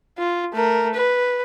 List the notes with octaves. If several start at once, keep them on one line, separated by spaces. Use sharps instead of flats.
F4
A3 A#4
B4